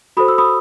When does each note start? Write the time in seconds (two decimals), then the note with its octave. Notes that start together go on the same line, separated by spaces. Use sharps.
0.17 F#4 A4 C5 B5 D#6
0.28 E6
0.38 B5 D#6